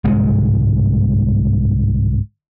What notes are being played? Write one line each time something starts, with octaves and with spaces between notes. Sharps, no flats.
G1 C2 G#2 G#3